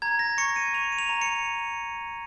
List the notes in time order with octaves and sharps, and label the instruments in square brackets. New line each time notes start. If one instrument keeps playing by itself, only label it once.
[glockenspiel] A#5 G#6
A#6
C#6 C#7
D#7
D#7
C#6 F7
D#7
F7
A#5
C#7